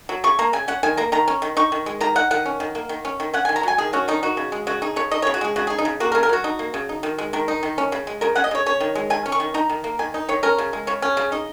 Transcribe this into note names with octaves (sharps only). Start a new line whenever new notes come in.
F#3
C#3 C#6
A#3 A#5
C#3 G#5
C#4 F#5
D#3 G#5
A#3 A#5
D#3 A#5
C#4
D#3
D#4 C#6
D#3
G#3
D#3 A#5
D#4 F#5
D#3 F#5
C#4
D#3
A#3
D#3
C#4
D#3
C#4 F#5
D#3 G#5
A#5
F#3 G#5
D#3 G#4
C#4 F#4
D#3 D#4
D#4 F#4
C#3
G#3
C#3 F#4
D#4 G#4
C#3 C#5
D#4 D#5
C#3 C#5
F#4
G#3 G#4
C#3 F#4
D#4 G#4
D#4
C#3
A#3 F#4
A#4
C#3
A#4
F#3 F#4
D#4
A#3
C#3
D#4
D#3
G#3
D#3 A#4
D#4
D#3
C#4
C#3
G#3
C#3 A#4
C#4 F#5
D#5
C#3 C#5
C#4 C#5
D#3
G#3
D#3 G#5
C#4
C#6
D#3
D#4 A#5
D#3
A#3
D#3 G#5
D#4
D#3 C#5
C#4 A#4
C#3
G#3
C#3 C#5
C#4
C#3
D#4 D#5